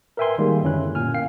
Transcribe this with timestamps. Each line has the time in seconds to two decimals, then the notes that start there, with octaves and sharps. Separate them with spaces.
0.17 A#4 B4 E5 G5 G#5 C6
0.38 D#3 G3 G#3 A#3
0.63 F#2 D3 C#4 E4 F#6
0.95 A#2 G#5 F6
1.14 A#3 F5 G5 C7